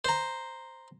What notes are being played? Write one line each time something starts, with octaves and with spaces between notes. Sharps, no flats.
C5 A#5